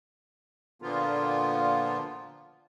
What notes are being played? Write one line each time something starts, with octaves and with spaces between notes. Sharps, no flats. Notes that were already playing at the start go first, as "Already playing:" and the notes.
A#2 D3 F3 A#3 B3 F4